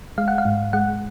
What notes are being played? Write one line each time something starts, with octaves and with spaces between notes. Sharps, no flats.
G#3 F5
F#5
F5
G#2
G#3 F#5